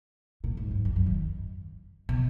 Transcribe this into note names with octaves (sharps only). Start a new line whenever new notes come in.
A#2
G#2
F#2
F#2
F#2
D#3
B2